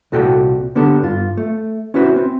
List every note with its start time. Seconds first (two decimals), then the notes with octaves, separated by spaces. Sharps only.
0.12 C2 A#2 F#4 A4 D5 G5
0.75 D3 B3 D4 G4 A4
1.03 G2 F4
1.37 A3
1.94 C#4 E4 F#4 B4 C5
2.16 C4